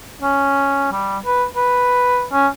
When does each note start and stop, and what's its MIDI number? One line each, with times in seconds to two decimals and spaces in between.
0.22 0.88 61
0.92 1.18 55
1.26 1.45 71
1.56 2.25 71
2.32 2.48 61